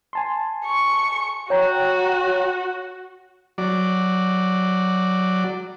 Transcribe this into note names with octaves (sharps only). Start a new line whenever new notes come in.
G#5 A5 C6
C#6
F#4 C#5 G5 A#5
F#3 D5